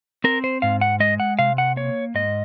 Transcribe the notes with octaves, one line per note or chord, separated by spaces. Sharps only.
C4 A#4
C5
G#2 F5
F#5
G#3 D#5
F#5
C3 F5
F#5
A#3 C#5
G#2 D#5